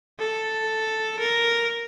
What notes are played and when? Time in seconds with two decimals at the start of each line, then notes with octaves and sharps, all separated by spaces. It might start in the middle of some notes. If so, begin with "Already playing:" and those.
0.20 A4
1.20 A#4